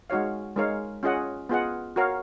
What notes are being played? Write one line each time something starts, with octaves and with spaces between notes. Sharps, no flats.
G#3 D#4 F#4 C#5 F5
G#3 D#4 A#4 C#5 F5
C#4 F4 G#4 D#5 F#5
B3 F4 G#4 D#5 F#5
F#4 A#4 C#5 F5